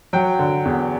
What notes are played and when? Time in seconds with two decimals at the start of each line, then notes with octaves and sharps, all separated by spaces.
0.13 F#3 G5
0.39 D3
0.65 E2